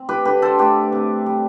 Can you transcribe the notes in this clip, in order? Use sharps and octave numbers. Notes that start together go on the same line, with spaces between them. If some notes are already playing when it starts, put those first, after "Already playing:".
Already playing: C4
G4 B4
D3 G4 B4
A4 C5
A3 G4 B4
C3
G3